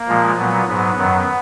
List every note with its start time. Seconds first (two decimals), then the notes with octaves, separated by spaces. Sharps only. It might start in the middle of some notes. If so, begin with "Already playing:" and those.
Already playing: A#3
0.09 A#2 F3 G#3
0.39 A#2 F#3 B3
0.68 G#2 F#3 B3
0.98 F#2 D#3 F#3